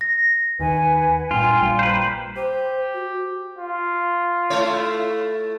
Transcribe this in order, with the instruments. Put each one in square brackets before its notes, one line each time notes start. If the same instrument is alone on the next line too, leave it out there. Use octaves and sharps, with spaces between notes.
[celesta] A#6
[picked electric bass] D#2 D#3 [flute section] B4 F#5 G#5
[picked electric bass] G2 A#2 [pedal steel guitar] F4 [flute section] F5 G5 G#5
[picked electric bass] A#1 A#2 G3
[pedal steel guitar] B4 C5 [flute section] G5 A#5
[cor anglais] G4 [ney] C5
[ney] F#4
[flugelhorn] F4
[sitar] A3 E4 C#5